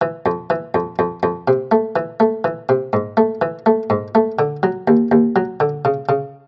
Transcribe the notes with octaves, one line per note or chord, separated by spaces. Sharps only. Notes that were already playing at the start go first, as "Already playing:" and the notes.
E3
F2
E3
F2
F2
F2
C3
A3
E3
A3
E3
C3
G#2
A3
E3
A3
G#2
A3
D3
F#3
D#2
D#2
F#3
D3
C#3
C#3